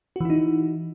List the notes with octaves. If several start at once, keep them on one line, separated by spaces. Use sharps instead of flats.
E3 D#4 E4 F#4